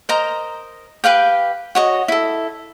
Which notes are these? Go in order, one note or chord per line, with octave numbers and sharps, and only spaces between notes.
A#4 C5 D#5 A#5
G4 B4 F5 G5
F#4 C#5 D#5
E4 A4